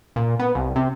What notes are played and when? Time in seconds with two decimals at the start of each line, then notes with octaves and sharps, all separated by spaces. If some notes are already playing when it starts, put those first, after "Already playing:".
0.16 A#2
0.39 B3
0.55 C2
0.76 C3